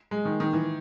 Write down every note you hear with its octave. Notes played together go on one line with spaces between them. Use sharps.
G#3
D#3
D#3
E3